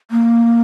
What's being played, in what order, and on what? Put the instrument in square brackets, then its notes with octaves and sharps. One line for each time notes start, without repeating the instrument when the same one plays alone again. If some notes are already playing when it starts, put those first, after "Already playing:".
[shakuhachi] A#3